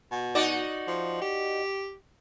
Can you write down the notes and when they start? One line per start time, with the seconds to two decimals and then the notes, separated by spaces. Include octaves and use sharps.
0.12 B2
0.35 D#4 F#4 D5
0.87 F3
1.21 G4